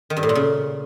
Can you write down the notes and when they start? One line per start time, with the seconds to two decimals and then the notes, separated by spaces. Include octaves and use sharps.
0.10 D#3
0.17 G2
0.23 A2
0.29 A#2
0.35 C#3